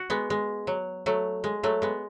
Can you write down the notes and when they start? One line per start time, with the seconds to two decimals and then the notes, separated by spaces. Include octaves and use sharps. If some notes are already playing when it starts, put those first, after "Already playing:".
Already playing: F#4
0.10 G#3 B3
0.30 G#3
0.67 F#3
1.06 F#3 A3
1.44 G#3
1.63 F#3 A3
1.82 G#3 B3